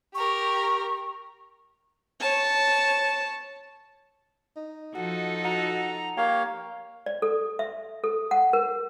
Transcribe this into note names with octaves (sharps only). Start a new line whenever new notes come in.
G4 A#4 C#6
C#5 A5
D#4
F3 D#4 F#4 A4
F#4 A#5
A#3 G4 C#5 F5
D5
A4
E5
A4
F#5
A#4